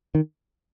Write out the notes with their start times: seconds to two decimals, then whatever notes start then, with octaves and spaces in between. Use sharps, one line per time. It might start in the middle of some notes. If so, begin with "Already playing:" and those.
0.15 D#3